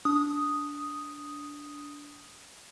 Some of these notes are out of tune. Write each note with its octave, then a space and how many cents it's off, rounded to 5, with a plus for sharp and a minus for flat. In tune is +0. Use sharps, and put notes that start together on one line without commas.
D4 -15 D#6 +0